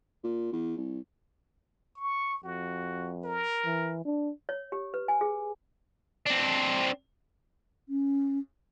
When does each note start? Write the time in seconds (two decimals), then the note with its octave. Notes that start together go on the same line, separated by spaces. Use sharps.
0.24 A#2
0.52 E2
0.77 C2
1.97 C#6
2.44 F2 F#4
3.24 A#4
3.65 E3
4.05 D4
4.49 C#5
4.72 G4
4.94 B4
5.08 G#5
5.21 G#4
6.26 C4 D4
7.89 C#4